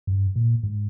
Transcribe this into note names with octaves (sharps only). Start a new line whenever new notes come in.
G2
A#2
G#2